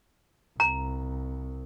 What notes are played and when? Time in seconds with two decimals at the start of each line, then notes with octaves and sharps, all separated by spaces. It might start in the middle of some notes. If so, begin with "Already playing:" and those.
0.60 C2 A#5